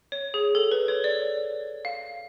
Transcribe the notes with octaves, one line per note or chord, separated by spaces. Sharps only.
C#5
G#4
A4
B4
C#5
D5
F5